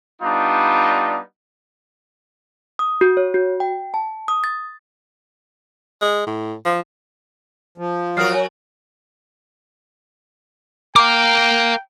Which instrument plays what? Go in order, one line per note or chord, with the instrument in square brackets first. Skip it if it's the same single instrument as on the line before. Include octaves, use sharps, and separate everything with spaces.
[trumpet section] G3 B3 D4 D#4 F4
[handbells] D#6
F#4
C#5
F#4
G5
A5
D#6
A6
[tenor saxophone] G#3
A2
F3
[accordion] F3
[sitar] F#3 F#4 A#4 [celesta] D#6 F6 C7
[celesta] C#5 G#5
[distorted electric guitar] A#4 F5 [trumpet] G5 [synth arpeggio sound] D6